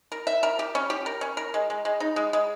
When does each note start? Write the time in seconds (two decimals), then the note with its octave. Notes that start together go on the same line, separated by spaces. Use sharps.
0.12 A#4
0.27 E5
0.43 A#4
0.59 G4
0.75 C#4
0.90 G4
1.06 A#4
1.21 C#4
1.37 A#4
1.54 G#3
1.70 G#3
1.85 G#3
2.00 D#4
2.16 G#3
2.33 G#3